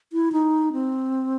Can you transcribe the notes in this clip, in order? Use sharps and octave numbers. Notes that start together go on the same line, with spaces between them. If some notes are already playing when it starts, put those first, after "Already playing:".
E4
D#4
C4